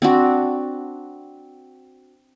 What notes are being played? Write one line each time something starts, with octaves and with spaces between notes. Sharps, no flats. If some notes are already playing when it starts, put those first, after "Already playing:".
C4 D4 F#4